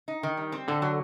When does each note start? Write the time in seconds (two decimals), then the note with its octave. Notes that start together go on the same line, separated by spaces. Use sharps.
0.08 D#4
0.23 D#3
0.37 G3
0.52 C4
0.68 D3 A4
0.82 F#3